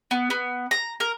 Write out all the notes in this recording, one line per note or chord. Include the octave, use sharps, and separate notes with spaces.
B3
B3
A#5
A#4